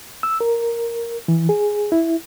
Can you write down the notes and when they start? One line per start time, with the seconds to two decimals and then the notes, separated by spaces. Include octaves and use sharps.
0.23 E6
0.41 A#4
1.28 E3
1.49 G#4
1.92 E4